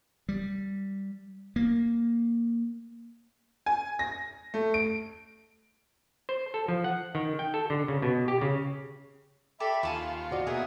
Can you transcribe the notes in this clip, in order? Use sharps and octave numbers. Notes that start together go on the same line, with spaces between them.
G3
A#3
G#5
A#6
A3
D7
C5
A4
F3
F#5
D#3
G5
A4
D3
C#3
B2
G4
C#3
G4 A4 D5 E5 B5
D#2 F4 G#5 A5 B5 C#6
F#4 D5 D#5
B2 A#3 G#4 E5 F#5 D#6